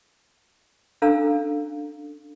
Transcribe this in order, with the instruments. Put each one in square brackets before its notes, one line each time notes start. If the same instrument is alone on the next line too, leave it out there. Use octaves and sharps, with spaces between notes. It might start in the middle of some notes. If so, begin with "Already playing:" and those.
[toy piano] C#4 D4 A4 F5 A#5 E6